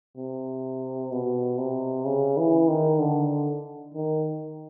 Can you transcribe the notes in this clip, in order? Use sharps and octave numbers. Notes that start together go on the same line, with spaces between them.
C3
B2
C3
C#3
E3
D#3
D3
D#3